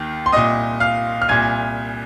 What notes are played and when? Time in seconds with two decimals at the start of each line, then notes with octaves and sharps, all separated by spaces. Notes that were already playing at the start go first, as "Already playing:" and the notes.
Already playing: D#2 D#3
0.26 C6
0.33 C2 A#2 D#5 D#6
0.80 F5 F6
1.22 F6
1.29 C2 A#2 G#5 G#6